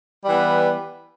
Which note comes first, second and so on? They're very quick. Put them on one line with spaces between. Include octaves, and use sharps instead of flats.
G3 E3 B3